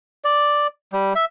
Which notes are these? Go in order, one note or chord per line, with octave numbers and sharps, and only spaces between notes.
D5
G3
E5